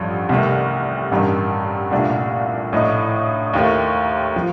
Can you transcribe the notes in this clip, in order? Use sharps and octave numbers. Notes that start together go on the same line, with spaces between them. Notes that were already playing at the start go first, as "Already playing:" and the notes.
Already playing: A1 G2 F3
C2 C3 D#3 A3
A1 G2 D#3
C2 A#2 A3 D4
A#1 A2 A3 D#4
D#2 D#3 A3
F3